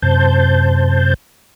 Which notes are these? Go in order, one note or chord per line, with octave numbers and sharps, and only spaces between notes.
F#2 C3 C5 A5 G6